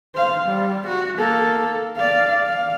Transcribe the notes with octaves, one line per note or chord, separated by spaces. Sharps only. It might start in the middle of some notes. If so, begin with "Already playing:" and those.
C5 F5
G3
F#4
A#3 A4
D5 F5
F5